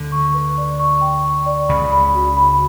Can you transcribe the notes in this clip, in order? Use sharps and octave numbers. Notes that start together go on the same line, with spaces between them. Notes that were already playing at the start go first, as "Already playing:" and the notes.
Already playing: D2 D3
C#6
B4
D5
C#6
G5
C#6
D5
C#2 C#3 B5
B5
F#4
B5